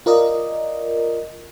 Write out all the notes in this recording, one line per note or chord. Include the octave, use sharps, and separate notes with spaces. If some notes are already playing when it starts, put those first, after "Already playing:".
F4 A#4 D5 D#5